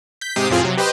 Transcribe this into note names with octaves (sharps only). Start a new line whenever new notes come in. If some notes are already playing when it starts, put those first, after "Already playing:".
G6 B6
G#2 C3 G4 D#6 C7
F2 A2 C4 F4 G#4
C3 F#3
G4 B4 C5 D#5 G5 C6